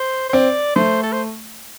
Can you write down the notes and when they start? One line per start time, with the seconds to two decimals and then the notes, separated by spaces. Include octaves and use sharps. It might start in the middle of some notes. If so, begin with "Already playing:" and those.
Already playing: C5
0.29 C5
0.33 C4 D5
0.76 A3 C5
1.04 A4
1.12 C5